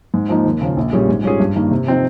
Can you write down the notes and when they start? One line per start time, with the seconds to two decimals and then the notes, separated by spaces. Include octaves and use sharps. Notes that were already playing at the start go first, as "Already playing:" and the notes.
0.14 G#2
0.29 F3 A#3 D#4
0.45 D#2
0.61 C#3 F3 A#3 F4
0.77 A#1
0.93 A#2 G3 C#4 G#4
1.08 G#2
1.24 G3 C#4 F4 G#4
1.40 G2
1.55 D#3 A#3
1.71 C3
1.87 F3 C4 D#4